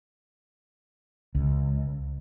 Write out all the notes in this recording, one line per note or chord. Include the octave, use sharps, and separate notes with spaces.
C#2